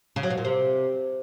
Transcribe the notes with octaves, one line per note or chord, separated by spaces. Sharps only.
C#3
F#3
B2
A#2
C3